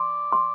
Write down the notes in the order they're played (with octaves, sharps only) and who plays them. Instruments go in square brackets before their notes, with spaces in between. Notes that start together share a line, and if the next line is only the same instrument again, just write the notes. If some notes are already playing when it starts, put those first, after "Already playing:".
Already playing: [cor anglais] D5 [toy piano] C6
[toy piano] C6